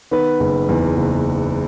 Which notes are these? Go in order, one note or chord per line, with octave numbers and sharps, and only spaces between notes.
D#3 B3 B4
F#1
E2
F#1